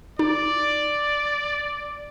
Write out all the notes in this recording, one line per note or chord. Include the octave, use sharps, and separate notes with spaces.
D#4 D5